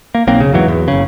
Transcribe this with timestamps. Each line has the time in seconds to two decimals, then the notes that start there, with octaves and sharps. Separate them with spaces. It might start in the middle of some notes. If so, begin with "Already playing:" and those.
0.15 A#3
0.27 B1 F#3 A#3 C4
0.40 F1 C#3
0.53 E2 G#2 E3 F#3
0.68 E2
0.88 F#1 C#3